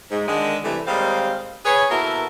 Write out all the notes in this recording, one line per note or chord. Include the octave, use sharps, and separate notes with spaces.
G#2
D3 D#3 G#3
C3 E3 G3 A3
D#2 G3 G#3 C4 F5
G#4 B4 C#5
B2 A#3 E4 F#4 A4 A#4